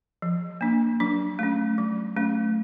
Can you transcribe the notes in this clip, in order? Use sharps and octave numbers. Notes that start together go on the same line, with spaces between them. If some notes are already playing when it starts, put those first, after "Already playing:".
F3
A#3 D4
F#3 D4
A3 C#4
F#3
A3 C#4